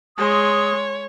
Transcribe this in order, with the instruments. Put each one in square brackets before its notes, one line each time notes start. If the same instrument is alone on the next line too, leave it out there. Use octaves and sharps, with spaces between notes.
[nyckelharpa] G#3 C6 [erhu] C#5 [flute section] D#6